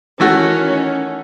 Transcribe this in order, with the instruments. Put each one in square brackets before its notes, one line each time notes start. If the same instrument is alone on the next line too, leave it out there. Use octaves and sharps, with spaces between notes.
[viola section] D#3 C#4 [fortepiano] E3 A3 F#4